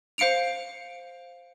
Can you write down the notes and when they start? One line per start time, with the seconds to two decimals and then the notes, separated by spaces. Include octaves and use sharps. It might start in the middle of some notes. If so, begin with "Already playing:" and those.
0.18 C5 F5 C#7 D7 F7